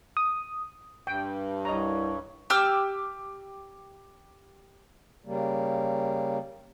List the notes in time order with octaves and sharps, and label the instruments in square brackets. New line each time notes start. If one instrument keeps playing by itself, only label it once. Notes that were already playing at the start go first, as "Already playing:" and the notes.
[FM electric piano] D#6
[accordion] G2 [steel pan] G5
[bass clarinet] C2 [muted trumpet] C#5 [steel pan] D#5 A#5
[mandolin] G4 D6 E6 F6
[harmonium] C#3 G3 A#3